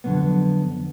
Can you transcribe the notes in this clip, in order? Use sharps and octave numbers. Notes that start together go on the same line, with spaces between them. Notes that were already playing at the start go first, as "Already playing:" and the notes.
F2 D3 F3 F#3 A#3 B3